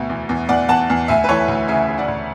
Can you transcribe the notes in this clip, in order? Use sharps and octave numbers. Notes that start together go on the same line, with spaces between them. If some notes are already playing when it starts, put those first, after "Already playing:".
Already playing: D2 B2
E2
E2
E2 D5 F#5
E2 F#5 A5
E2
D2 E5 G#5
B4
E3 A4 C#5
D2
C#3 E5 G#5
C#3
D5 F#5
D2